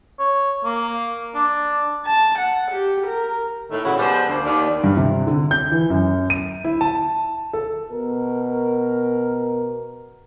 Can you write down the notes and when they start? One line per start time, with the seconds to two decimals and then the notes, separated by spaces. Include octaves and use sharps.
0.19 C#5
0.65 A#3
1.35 D4
2.06 A5
2.38 F#5
2.71 G4
3.07 A#4
3.70 A2 D#3 A3
3.83 A#2 C#3 E4 F#4
3.99 F3 G3 G#3 B3 B4 C5
4.28 D2 D3 A#3
4.44 D#2 D5
4.84 G2
4.97 C3
5.27 D3
5.51 G6
5.72 E3
5.90 F#2
6.30 D#7
6.64 E4
6.81 A5
7.53 A4
7.90 B2 A#4